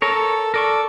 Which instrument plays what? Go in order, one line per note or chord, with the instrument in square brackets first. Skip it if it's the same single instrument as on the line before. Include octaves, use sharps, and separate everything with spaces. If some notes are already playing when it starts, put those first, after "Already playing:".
[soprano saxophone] A4 [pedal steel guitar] A#4 C#5
[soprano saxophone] A4 [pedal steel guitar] A#4 D5 C#6